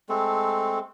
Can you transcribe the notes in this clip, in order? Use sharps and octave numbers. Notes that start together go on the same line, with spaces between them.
G#3 A3 C4 A4